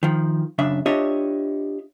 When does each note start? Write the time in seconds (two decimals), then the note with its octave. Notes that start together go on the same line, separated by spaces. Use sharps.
0.03 D#3 F3
0.58 F#2 C#3 D4 E5
0.86 D4 F4 G4 C#5 D#5 E5